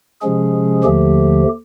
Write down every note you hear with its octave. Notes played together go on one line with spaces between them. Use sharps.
C3 F3 G#3 C#4 G#4
D#2 D3 F3 A3 G4